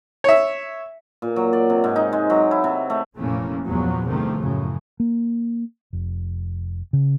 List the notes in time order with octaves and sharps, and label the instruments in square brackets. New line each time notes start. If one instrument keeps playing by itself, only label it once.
[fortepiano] C#5 E5
[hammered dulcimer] A#2
F#3
D5
C3
G#2
D#4
G#3
F#3
E4
C3
A3
[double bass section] F1 A#2 E3 A3 A#3 C#4
E2 G2 A#2 F3 F#3 B3
G2 C3 D#3 F3 A3
F#2 A2 C#3
[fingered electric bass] A#3
F1
C#3